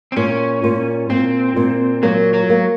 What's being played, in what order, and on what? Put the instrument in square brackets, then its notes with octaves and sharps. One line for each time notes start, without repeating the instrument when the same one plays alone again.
[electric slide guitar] C4
[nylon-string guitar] A#2 [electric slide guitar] C#4
[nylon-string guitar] A#2
[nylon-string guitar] A#2 [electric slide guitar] C4
[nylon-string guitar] A#2
[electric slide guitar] F#3 [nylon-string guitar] A#3
[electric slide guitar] F#3
[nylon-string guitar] A#3